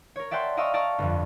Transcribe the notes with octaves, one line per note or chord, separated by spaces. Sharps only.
A#4 C#5
D5 E5 F#5 G5 A5 C6
D5 D#5 F5 A#5 C#6 E6
D5 A5 A#5 C#6 F6
G1 F2